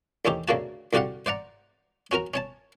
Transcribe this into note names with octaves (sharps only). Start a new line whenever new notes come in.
A1 D#2 C#4 D#4 G4
D2 C#3 A#3 F#4 A5
C2 D3 F#4 G4 F5 F#5
C5 D5 F#5 A#5
C#4 F#4 A#4 A#5
C#4 C#5 A5